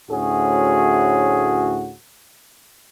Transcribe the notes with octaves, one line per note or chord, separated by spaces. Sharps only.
D2 A2 C#4 F#4 G#4